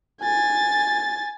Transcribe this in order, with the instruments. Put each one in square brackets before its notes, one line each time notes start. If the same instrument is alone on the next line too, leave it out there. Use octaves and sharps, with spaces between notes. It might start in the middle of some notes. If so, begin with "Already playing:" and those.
[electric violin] G#5 A6